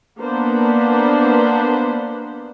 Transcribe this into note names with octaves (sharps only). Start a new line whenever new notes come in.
A#3 B3 D4 B4 C5